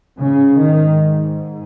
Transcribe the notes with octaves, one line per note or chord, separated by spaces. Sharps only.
G#2 C#3
D#3